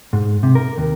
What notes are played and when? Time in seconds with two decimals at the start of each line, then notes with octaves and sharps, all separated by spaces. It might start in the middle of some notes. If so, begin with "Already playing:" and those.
0.13 G#2
0.43 C3
0.55 A#4
0.78 D#2